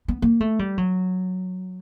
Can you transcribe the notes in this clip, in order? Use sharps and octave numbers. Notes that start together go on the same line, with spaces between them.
B3
A#3
A3
G3
F#3